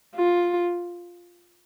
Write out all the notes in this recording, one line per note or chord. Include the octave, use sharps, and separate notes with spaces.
F4